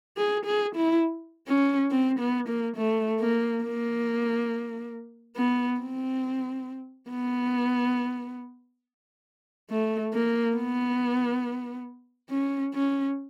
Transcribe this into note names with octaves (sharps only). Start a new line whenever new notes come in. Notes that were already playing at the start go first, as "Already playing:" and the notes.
G#4
G#4
E4
C#4
C4
B3
A#3
A3
A#3
A#3
B3
C4
B3
A3
A#3
B3
C#4
C#4